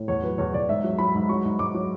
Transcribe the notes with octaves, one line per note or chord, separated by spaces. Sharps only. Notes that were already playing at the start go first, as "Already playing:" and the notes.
Already playing: A2
E2 C#5
F#3 B4
E2 C#5
E2 D5
G#2 E5
F#3
F#3 B5
G#2
F#3 C#6
G#2
G#2 D6
F#3